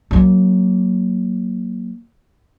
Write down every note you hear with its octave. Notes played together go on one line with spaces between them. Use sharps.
F#3 A#3